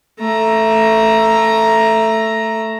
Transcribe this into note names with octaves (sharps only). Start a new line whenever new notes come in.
A3 A#5